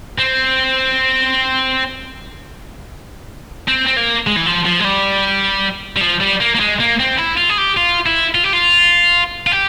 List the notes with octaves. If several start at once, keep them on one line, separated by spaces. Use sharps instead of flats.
C4
C4
C4
A#3
G#3
E3
F3
F3
G#3
G3
G3
F3
G3
A#3
A#3
G#3
A#3
C4
E4
F4
G#4
G4
F4
E4
F4
G4
F4
F4
G4